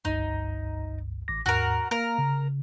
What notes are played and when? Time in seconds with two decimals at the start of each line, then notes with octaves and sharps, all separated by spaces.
0.05 G1 C#2 G2 D#4
1.28 A1 D6 A#6
1.46 D#2 G#2 F#4 A#4
1.91 A#3 A#4 F5
2.18 C#3